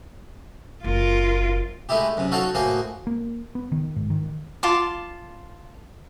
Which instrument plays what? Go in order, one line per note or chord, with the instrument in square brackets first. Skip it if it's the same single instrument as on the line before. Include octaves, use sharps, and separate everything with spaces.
[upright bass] F#1 [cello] F4 A#4
[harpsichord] G#3 A3 D#4 E4 G4
F#2 C3
D#4 F#4 A4 C#5 F5 F#5
A2 A#3 F#4 G#4 C5
[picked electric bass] A#3
B3
D#3
G#2
D#3
[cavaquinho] F4 A5 C6 D6